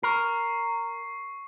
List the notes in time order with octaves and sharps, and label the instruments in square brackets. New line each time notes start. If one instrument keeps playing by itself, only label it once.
[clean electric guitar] A#4 [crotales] C#6 C7